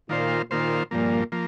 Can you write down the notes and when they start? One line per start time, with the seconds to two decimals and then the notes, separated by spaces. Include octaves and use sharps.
0.09 A#2 D#3 A#3 F4 C5
0.50 A#2 D#3 A#3 F4 C5
0.91 G2 A#2 F3 A#3
1.32 F3 A#3